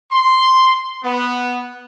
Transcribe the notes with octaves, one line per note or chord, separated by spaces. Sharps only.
C6
B3